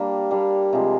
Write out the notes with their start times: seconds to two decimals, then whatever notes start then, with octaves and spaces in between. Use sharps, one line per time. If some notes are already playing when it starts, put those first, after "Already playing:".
Already playing: G3 A#3 D4
0.31 G3 A#3 D4
0.73 C3 F3 G#3